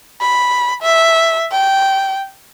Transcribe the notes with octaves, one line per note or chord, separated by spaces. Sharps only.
B5
E5
G5